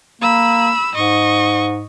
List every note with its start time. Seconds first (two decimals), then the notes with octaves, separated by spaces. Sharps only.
0.22 A#3 B5 E6
0.94 G#2 D#5 C#6